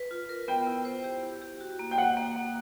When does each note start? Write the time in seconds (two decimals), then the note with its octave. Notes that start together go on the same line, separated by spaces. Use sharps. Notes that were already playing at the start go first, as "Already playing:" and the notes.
Already playing: B4
0.11 F4
0.29 A#4
0.48 B3 G5
0.67 E4
0.85 C5
1.04 G4
1.23 E4
1.42 G4
1.61 F#4
1.79 A#3
1.91 G5
1.98 A#3 F#5
2.17 A#3
2.36 A#3